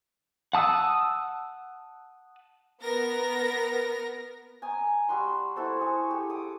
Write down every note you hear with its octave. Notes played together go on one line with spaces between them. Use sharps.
F#5 A5 D#6 E6
B3 A#4 A#6
G#5 A#5 D#6
G3 F#4 C6
E4 F#4 A4 C5
G#4 A4 C#6
G4
D6 D#6